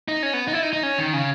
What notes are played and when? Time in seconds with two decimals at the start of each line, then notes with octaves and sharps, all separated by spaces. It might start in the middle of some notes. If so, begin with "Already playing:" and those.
0.08 D#4
0.23 C#4
0.33 B3
0.48 D#4
0.53 E4
0.63 D#4
0.73 D#4
0.83 C#4
0.98 D#3
1.13 C#3